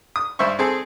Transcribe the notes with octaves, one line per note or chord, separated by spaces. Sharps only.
D#6
G2 C5 E5 C#6
C4 G#4 A4